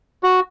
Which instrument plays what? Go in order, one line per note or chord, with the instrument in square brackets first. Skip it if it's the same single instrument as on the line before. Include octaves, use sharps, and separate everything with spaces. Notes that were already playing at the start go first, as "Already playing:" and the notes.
[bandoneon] F#4